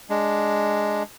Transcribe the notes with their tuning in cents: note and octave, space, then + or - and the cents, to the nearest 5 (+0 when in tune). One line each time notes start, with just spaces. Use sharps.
G#3 +0 D4 +0